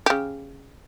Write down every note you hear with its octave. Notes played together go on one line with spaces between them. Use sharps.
C#3 G4